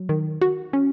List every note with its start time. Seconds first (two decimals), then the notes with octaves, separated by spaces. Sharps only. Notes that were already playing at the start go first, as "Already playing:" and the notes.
Already playing: F#3
0.09 D#3
0.42 F#4
0.73 C#4